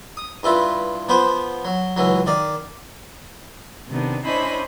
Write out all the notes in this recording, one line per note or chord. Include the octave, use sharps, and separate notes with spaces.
D#6
G2 E4 F4 B4
F3 B3 B4 C5
F#3
C#2 E3 F#3
D#3 D5 F5
C3 D#3 B3 D4
C#4 D4 E4 C5 D#5 B5